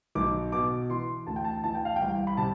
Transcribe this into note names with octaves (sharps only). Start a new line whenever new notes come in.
B1 D6
B2 D6
E3 C6
D2 A5
G5
A5
E3 A5
G5
F5
G5
C2
B5
C3 A5